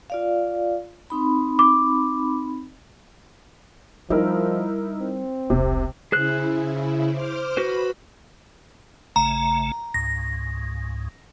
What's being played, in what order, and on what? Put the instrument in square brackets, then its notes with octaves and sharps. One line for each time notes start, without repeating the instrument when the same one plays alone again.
[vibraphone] F4 D5 F5
C4 D#4 B5
[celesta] D6
[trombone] F3 [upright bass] G3 [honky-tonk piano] D#4 E4 A#4
[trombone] C4
[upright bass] E1 C2 [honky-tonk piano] C3
[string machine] C#3 E4 [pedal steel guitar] G#4 C5 F#6
[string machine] C5 D6 F6
[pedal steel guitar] F#4 B4 C5 [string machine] B5
[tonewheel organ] A1 C#3 A3 [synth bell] A#5
[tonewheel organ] C#2 G#2 [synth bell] A#6